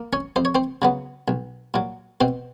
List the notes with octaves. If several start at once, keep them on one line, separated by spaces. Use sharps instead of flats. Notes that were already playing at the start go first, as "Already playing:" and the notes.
Already playing: A#3
C#4 C#5
F2 C5
C#5
C4 C5
C#3 F#3 B3
B1
A#2 F#3
B2 C4 C5